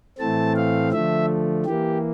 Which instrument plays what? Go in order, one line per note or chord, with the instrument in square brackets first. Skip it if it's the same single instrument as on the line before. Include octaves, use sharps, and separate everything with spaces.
[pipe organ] A2 E3 A3 C4 A5
F5
D3 F3 A3 E5
E3 A#3 G4